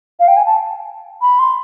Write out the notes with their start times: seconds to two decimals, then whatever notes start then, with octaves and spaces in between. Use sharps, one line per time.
0.20 F5
0.28 G5
0.37 G#5
0.46 A5
1.22 B5
1.39 C6